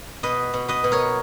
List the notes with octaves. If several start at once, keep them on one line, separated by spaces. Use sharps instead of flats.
B2 B4 D#5
B2
B4 D#5
B2
A#4 C#5